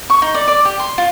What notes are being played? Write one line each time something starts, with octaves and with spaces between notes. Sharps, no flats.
C#6
D#4
D5
D5
G4
C6
F4